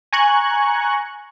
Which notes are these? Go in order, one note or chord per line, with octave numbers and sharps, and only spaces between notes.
G#5 A#5 C#6 F#6 G#6